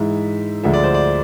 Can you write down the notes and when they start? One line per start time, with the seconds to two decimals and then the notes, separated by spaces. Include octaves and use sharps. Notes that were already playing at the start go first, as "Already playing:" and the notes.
Already playing: G#2 E3 G#3 E5
0.63 D2 D3 F3 G#3 E5
0.73 D5
0.83 C5
0.94 D5